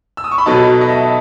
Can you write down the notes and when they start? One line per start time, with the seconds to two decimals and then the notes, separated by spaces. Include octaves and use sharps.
0.17 E6
0.24 D#6
0.31 C#6
0.38 B5
0.46 B2 F#3 B3 D#4 A4 A5
0.81 D#5
0.88 E5